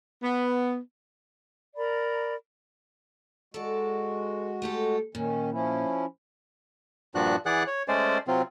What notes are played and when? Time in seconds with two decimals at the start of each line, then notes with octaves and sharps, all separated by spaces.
0.23 B3
1.76 A#4 D5 A#5 B5
3.54 G#3 F#4 A4 D5
4.62 A3 G4 A4
5.15 A#2 D#3 C#4
5.52 F3 C#4 E4
7.15 G2 A#2 F3 D4 F#4 F#6
7.46 E3 G#4 D5 F#5 F#6
7.67 C#5
7.88 G#3 A3 C#4 C5 D5
8.27 C3 F#3 C4 F4